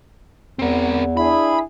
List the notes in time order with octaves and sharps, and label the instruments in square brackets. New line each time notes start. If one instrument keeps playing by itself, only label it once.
[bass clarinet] E2 [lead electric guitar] C4 A#4
[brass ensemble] D4 E4 G#4 [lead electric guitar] B5